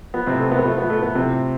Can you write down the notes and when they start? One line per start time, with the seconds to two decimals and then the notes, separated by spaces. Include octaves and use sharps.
0.14 F3 B3
0.26 A2 C3 C4
0.39 A3
0.47 F3 B3
0.59 B3
0.64 F3 A3
0.78 F3 B3
0.90 A3
0.99 A2 B3
1.15 C3 F3 C4
1.32 A2